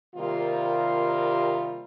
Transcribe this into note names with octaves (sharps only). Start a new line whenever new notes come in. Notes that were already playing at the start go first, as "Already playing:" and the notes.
C3 D#3 G3 A#3 F4